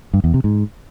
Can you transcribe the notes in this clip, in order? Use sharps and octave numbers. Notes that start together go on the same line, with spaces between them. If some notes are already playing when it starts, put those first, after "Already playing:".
G2
E2
C3
G#2